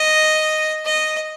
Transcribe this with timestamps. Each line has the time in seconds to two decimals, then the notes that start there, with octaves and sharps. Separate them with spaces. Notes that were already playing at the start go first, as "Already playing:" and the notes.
Already playing: D#5
0.86 D#5